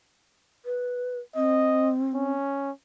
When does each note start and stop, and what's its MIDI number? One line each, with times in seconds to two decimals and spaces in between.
0.65 1.19 71
1.36 2.31 60
1.36 1.90 75
2.14 2.71 61